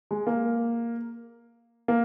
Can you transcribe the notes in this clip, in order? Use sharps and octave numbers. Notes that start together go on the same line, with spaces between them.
G#3
A#3
A#3